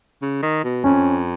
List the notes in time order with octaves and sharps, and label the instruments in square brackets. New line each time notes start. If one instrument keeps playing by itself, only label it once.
[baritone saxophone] C#3
D#3
B2
[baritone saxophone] F2 [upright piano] C#4